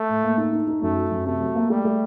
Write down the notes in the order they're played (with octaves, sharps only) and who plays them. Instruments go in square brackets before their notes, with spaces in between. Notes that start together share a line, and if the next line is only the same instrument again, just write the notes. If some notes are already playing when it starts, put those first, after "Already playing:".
Already playing: [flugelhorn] A3
[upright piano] A2
A#3
D#4
D#4
D#4
[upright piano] F#2 [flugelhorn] A3
[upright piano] F#3
F#2
[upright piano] C3 [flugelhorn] A3
[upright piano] F#3
A#3
[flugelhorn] G3 [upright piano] A3
[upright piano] A3